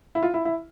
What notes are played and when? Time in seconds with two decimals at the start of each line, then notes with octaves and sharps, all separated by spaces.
0.15 E4
0.23 F4
0.34 E4
0.45 E4